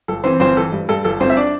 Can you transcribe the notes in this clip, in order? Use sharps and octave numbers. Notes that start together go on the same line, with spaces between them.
G1 A4
E3 C4 C5
G1 C4 C5
E3 A4
G2
G2 A4
G1 A4
G1 C4 C5
E5
D4 D5